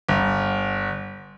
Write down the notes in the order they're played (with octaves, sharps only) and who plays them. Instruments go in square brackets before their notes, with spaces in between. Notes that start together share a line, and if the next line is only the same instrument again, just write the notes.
[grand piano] G1